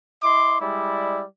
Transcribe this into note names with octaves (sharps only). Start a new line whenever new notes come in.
E4 D#5 C6 D6
G3 G#3 E4 D5